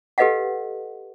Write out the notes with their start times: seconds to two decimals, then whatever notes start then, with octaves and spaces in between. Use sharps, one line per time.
0.18 G4 A4 B4 D#5 F5 F#5